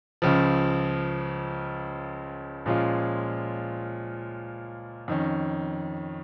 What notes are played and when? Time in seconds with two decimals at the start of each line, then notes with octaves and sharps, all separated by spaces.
0.22 C#2 C#3 F3
2.66 A#2 F3 G#3 C#4 F4
5.08 F2 D#3 C#4